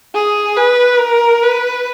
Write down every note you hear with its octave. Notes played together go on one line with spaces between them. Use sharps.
G#4
B4
A#4
B4